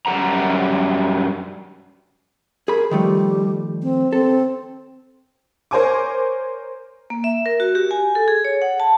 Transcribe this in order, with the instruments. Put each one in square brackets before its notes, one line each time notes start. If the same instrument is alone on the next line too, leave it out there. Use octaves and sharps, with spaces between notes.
[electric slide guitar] F#2 G3 G#4 F#5 A#5
[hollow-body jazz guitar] G#4 B5 [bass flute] A#4
[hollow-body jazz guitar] D#3 F3 A3 [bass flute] G3
[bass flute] C4
[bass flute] C4 [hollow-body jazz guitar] A4
[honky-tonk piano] A#4 C5 C#5 G#5 C#6 D6
[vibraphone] A#3
E5
A#4
F#4
G4
G#5
A4
G#4
C#5
F#5
A5